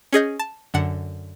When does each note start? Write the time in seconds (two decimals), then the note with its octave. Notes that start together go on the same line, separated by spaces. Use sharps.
0.13 C#4 G#4 D#5 G6
0.39 A5
0.74 F#2 D3 F#5